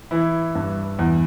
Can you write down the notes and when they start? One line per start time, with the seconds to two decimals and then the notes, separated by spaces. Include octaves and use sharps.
0.11 E3 E4
0.55 G2
0.99 E2